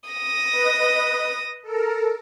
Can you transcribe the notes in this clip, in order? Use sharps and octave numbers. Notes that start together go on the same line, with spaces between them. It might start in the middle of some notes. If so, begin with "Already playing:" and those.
D#6 A#6
B4 D#5
A4 A#4